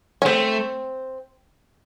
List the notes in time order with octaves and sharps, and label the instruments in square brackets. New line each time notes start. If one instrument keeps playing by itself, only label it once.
[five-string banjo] C#4
[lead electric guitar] A3 [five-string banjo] C4